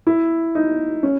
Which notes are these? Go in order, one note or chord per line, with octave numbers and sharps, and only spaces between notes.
E4
D#4
C#4